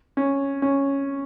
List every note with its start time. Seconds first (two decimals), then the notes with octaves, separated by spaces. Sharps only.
0.17 C#4
0.62 C#4